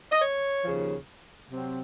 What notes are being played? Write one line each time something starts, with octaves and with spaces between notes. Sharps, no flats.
D#5
C#5
D#2 C#3 F3
C3 F#3 C4